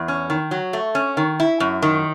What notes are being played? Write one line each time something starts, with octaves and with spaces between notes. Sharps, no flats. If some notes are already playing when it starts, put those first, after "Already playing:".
Already playing: E2
C#4
D#3
F#3
A3
C#4
D#3
E4
F#2
D#3